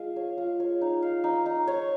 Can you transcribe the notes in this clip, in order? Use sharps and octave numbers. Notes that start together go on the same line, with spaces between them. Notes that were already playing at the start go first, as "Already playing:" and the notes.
Already playing: G#3 F4
C#5
F4
C#5
D#4
F5
D#4
D#4
C#5